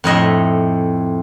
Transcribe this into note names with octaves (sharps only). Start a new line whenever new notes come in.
F2 A2 D#5 E5